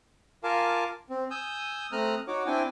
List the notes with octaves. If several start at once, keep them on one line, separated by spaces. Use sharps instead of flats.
F4 A#4 F5 G#5 A5 D6
C4
G#5 D#6 E6 G6
A3 C4 A#5 D#6 F6 F#6
D#4 F#4 C#5 F#5 D6
C4 D4 E4 G5 G#5 D6